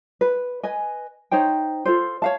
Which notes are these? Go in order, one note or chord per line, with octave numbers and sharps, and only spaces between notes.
B4
B4 D#5 G#5
D#4 C5 C#5 G5
F4 A4 C5
C#5 F5 A5